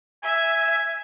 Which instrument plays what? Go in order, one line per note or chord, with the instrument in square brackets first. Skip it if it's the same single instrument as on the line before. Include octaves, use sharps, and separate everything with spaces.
[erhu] E5 [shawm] G#5